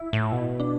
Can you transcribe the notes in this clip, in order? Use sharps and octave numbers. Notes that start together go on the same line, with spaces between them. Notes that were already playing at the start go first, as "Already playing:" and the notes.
Already playing: E4
A2
B2
D4